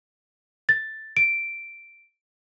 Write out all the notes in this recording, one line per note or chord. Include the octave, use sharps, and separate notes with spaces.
A6
D7